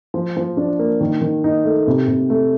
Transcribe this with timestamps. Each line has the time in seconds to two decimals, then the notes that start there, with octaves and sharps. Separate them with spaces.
0.14 F3
0.37 F3
0.57 D4
0.79 A#3
1.01 D#3
1.21 D#3
1.44 D#4
1.65 A3
1.87 C3
2.08 C3
2.30 A3